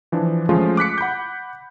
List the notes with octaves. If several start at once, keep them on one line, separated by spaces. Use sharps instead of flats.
E3 F3 D4
F3 G#3 A3 C#4 F4
D6 F#6 B6 C#7
F#5 B5 D6 G6